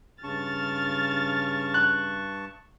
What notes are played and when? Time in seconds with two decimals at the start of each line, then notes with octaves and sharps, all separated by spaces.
0.23 G2 C#3 A5 C#6 F6 A6
1.74 F#6